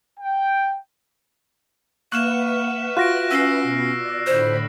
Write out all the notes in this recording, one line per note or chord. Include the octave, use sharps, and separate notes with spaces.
G5
A#3 B4 E5 F#5 C#6 F6 F#6 E7
F4 F#4 F#6 A#6 D7
C#4 E6 F#6 C7
B2
D5
A2 D3 C5 B5